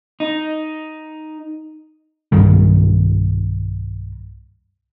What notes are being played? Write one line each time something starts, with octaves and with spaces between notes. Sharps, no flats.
D#4
B1 G2 D#3 G3